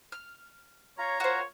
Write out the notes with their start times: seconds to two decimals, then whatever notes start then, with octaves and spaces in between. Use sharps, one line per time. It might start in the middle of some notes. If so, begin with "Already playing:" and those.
0.12 F6
0.98 F4 C#5 A#5
1.20 F4 F#4 A#4 C5 C#5